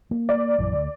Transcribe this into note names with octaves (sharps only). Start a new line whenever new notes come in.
A#3
D5
A#1 F#2 E3
D2